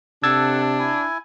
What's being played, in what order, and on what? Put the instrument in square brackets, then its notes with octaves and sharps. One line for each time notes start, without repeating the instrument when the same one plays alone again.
[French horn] C3 [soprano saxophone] D4 [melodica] A4 F#5 [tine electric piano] E6 G#6 A6
[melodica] E4 G#5